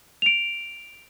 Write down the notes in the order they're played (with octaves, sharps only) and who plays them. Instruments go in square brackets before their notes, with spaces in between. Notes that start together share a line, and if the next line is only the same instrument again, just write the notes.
[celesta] D7 F7